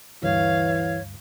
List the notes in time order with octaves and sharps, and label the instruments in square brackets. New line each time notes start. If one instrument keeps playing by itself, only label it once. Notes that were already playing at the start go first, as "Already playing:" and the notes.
[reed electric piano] D2 G2 [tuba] E3 [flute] C#5 [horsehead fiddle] F5